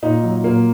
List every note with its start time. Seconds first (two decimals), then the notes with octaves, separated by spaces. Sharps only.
0.03 A#2 D#4
0.23 F#3
0.44 A#2 A#3